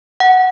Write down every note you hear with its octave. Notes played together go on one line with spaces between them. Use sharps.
F#5